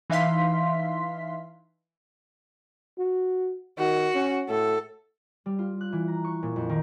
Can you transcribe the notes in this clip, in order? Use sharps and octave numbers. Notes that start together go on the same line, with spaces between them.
E3 D#4 E5 F5 C6 B6
F#4
D#3 F#4
C#4
A2 A4
G3
F4
F#6
E3
A#5
C#6
A#2
F2
D#3